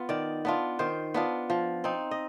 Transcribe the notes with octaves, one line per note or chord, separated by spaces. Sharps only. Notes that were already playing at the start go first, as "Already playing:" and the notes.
Already playing: B3 F4
D#3 D5
B3 D4 F4
D#3 C5
B3 D4 F4
F3
C4 D#4
D#5